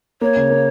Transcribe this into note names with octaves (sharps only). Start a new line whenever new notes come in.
A#3 C#5
C#3
A#3